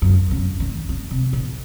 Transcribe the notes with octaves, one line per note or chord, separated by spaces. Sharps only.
F#2
C#3
D#3
C#3
C3
A#2